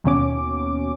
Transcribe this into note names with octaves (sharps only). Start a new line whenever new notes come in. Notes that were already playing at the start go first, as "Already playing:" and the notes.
D#2 B2 C#4 D6